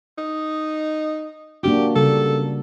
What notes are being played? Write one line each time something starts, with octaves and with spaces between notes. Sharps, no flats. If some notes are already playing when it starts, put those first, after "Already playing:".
D#4
A#3 D4 F#4 G4
C#3 G3 A4